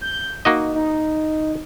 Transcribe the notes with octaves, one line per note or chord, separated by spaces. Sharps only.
G6
A#3 D#4 F#4 D#5
D#4